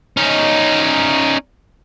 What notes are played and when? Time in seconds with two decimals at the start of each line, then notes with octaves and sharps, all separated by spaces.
0.17 C#4 D#4